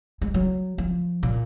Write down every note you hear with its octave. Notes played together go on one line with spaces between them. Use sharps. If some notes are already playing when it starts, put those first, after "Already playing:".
G#3
F#3
F3
A#2